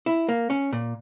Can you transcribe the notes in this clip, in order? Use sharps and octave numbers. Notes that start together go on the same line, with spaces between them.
E4
A#3
C#4
A#2